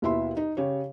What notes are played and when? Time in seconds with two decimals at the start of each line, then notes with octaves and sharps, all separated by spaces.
0.02 D#2 B2 E4 E5 C6
0.37 D#4
0.57 C#3 G4 C#5